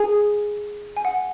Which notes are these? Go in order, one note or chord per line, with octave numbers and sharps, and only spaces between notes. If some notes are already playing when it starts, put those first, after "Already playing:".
Already playing: G#4 G#5
G#5
F#5